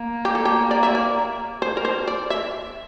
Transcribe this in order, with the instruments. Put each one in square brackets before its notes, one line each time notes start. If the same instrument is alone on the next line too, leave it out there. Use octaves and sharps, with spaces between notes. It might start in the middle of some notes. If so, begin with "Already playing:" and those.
Already playing: [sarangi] A#3
[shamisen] G4
A4
G4
D5
E5
D5
C5
A#4
C5
D5
E5